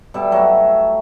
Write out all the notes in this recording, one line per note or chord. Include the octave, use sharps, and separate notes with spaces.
B2 G3 A4 E5
F#3 A3 E4